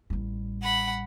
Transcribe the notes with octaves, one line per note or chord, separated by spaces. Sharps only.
A1 G3
F#5 B5